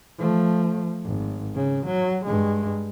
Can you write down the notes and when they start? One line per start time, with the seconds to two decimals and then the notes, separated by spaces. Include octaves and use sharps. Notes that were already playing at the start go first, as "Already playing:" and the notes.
0.19 F3 A3
1.04 G#1
1.55 C#3
1.86 F#3
2.26 G2 G#3